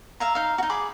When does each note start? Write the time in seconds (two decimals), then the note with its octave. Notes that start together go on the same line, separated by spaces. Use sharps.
0.20 E5 F5 A#5
0.35 D#4 F5
0.58 D#4 F#4
0.70 G#4 B5 D6